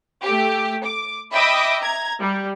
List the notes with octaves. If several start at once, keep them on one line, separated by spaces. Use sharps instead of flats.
A3 G4
D6
D#5 E5 G5 B5 D6 D#6
A#5 G#6
G3